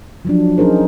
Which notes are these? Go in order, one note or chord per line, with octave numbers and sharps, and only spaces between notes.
F3 F#3 D4
F#3 C#4 D#4 G#4 A#4 C5